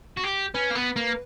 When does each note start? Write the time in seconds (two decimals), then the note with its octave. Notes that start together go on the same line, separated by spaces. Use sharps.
0.17 F#4
0.24 G4
0.54 C#4 B4
0.70 A#3
0.75 B3
0.96 A#3